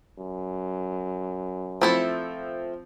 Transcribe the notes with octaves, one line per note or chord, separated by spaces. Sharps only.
F#2
F3 A3 C4 E4 A4